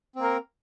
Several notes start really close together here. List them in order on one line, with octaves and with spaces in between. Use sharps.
C4 A#3 A#4